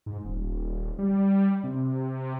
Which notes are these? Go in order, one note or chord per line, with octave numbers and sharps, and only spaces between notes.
G#2
D#1
G3
C3